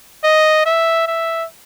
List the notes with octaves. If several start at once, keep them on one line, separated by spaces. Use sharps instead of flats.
D#5
E5
E5